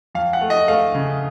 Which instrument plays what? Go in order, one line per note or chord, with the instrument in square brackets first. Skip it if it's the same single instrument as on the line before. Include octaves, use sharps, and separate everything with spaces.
[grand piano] F2 F5
F#5
A3
D#5
A3 F5
C#3